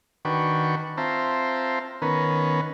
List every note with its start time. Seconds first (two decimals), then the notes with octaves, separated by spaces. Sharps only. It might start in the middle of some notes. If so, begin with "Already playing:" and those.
0.25 D#3 D4 F#4 B4 G5 C#6
0.98 C4 F4 C5 E5 A5 A#5
2.02 D#3 B3 C#4 A#4 B4